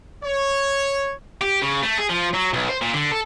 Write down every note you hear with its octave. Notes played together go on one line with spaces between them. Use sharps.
C#5
G4
C#3
A3
G#4
F3
F#3
B1
C5
A#2
D3
A4